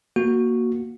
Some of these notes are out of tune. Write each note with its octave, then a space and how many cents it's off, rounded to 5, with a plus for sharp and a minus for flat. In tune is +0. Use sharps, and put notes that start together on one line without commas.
A#3 +10 F#4 +0